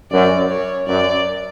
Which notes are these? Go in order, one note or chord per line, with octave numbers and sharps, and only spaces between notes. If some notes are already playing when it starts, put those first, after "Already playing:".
F#2 D5
C#5
F#2 D5